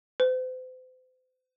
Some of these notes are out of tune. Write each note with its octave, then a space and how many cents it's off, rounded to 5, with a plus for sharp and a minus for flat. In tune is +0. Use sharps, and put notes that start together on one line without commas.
C5 -40